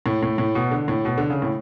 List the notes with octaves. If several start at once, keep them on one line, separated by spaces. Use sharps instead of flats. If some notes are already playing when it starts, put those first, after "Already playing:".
A2
A2
A2
B2
D3
A2
B2
D3
C#3
A2